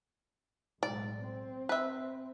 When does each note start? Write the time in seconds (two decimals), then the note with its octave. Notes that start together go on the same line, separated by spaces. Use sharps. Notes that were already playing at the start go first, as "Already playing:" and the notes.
0.83 B1 A2 G#3 D5
1.25 C4
1.69 B4 E5